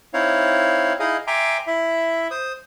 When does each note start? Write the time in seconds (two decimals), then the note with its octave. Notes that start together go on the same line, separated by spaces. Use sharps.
0.14 C4 D#4 E4 C#5 F5
1.00 D#4 E4 G#4 D#5 F5
1.27 E5 G5 G#5 A#5 C6 D6
1.67 E4 E5
2.31 C5 D#6